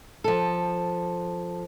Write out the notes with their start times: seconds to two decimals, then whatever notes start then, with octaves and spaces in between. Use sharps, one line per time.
0.24 F3 A4